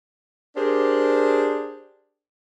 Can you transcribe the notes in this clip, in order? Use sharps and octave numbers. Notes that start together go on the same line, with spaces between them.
D4 G4 G#4 A#4 C5